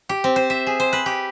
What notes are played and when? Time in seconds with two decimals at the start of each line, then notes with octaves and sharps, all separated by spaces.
0.09 G4
0.24 C4
0.36 C5
0.50 E5
0.67 G#4
0.80 C5
0.93 B4
1.06 G4